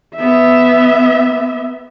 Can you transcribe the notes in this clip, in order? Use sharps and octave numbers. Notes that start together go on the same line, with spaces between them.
B3 E5